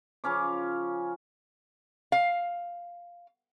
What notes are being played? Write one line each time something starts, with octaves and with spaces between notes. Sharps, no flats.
C#3 F3 C#4 D6
F5